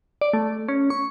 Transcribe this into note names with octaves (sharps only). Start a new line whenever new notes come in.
D5
A3
C#4
C#6